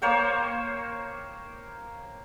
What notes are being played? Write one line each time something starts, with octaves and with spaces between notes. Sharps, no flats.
A#3 C5 C#5 G5